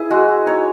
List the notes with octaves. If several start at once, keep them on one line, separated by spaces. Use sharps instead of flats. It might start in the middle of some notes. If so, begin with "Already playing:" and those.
Already playing: E4 G#4 B4
G#3 F#4
G#3
D#4 C#5